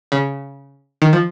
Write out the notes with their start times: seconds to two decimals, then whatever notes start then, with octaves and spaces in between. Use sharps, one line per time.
0.12 C#3
1.02 D#3
1.13 F3